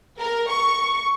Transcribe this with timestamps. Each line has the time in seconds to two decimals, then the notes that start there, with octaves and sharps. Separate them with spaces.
0.19 A#4
0.49 C#6